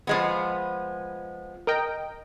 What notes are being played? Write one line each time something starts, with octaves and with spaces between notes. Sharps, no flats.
F3 G#3 B3
A#4 D#5 G5